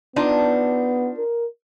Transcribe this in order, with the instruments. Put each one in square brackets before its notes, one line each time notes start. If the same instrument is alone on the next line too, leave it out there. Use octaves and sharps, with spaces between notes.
[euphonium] B3 [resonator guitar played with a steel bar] D4 D#4 F4
[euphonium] A#4